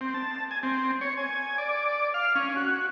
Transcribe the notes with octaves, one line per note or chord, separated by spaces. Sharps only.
C4
A5
G#5
C4
C#5
G#5
D5
F5
C#4
F#4